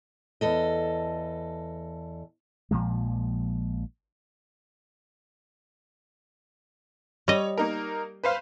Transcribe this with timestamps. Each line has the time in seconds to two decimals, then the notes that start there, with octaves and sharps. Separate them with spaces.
0.41 E2 A4 D#5
2.71 A#1 A#2 F3 G#3
7.28 G3 C#5 D#5
7.58 A#3 D#4 A#4
8.24 B4 C5 F5